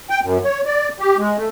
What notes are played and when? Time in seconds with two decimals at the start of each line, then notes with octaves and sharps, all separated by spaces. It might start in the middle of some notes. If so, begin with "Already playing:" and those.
0.10 G5
0.23 F#2
0.45 C#5
0.65 D5
0.99 G4
1.18 G#3
1.37 A3